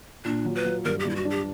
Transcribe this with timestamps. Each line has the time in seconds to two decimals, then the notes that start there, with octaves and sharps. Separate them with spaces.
0.25 A#2 D4
0.45 F#3
0.55 B4
0.65 F#3
0.85 G2 A#4
1.00 G4
1.05 G2 E4
1.16 F#4
1.25 D4
1.30 G4